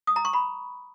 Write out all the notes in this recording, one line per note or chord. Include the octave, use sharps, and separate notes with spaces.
D#6
A#5
C#6
B5